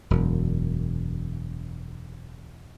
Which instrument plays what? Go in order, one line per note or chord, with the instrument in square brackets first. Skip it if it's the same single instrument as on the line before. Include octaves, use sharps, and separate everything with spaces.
[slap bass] E1 F#2